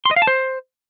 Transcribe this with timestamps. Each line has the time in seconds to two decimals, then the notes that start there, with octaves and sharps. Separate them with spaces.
0.05 C6
0.11 D#5
0.16 F5
0.22 A5
0.27 C5